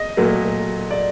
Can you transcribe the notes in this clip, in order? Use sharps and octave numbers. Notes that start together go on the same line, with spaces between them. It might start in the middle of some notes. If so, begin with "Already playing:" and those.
Already playing: D#5
A#2 F#3 A3
D5